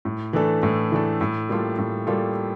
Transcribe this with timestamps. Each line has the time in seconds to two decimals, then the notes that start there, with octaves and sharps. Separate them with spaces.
0.05 A2
0.33 E3 A3 D4 A4
0.63 A2
0.92 E3 A3 D4 A4
1.21 A2
1.49 G3 A#3 F4 A4
1.78 A2
2.07 G3 A#3 F4 A4